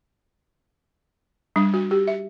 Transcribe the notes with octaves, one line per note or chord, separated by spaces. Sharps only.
G3 D4
F#4
G4
E5